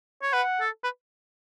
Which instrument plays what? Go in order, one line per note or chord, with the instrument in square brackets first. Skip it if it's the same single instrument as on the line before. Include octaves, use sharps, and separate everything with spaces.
[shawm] C#5
[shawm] B4 [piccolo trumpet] F#5
[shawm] A4
B4